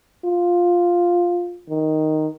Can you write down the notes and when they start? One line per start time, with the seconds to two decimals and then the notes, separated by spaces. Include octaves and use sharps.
0.24 F4
1.69 D#3